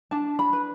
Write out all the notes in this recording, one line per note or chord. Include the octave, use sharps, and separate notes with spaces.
D4 A5
B5
B4